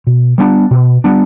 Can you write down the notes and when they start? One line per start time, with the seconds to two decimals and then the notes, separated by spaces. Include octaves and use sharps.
0.07 B2
0.38 G3 B3 D4
0.71 B2
1.04 G3 B3 D4